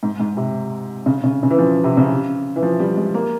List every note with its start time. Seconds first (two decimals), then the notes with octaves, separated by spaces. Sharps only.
0.03 G#2
0.20 G#2
0.37 C3
1.06 C#3
1.24 C#3
1.43 C#3
1.50 E3
1.58 F3
1.84 C3
1.97 C#3
2.56 E3
2.62 F3
2.80 G3
2.97 G#3
3.14 A#3